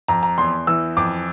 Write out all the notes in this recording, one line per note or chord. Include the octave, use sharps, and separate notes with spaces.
F2 A#5
A#5
E2 C6
E3 E6
F2 D6